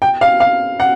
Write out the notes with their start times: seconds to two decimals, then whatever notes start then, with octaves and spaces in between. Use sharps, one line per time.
0.02 G5
0.21 F5
0.40 F5
0.80 F#5